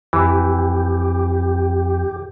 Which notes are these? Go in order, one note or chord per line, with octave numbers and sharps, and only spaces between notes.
F2 E3 G4